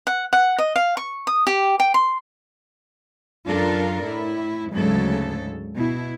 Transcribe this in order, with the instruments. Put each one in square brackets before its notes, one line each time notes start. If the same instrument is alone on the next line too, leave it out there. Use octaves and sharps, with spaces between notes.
[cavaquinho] F#5
F#5
D#5
F5
C#6
D#6
G4
G5
C6
[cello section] F#2 D4 F4 A4 A#4
A2 E4
D2 G#2 C#3 F#3 G#3 A4
B2 E4